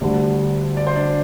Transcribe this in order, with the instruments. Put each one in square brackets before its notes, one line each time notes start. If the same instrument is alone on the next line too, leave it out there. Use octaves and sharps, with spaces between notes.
[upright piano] D2 D3 G3
[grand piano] D5
C5
D4 D5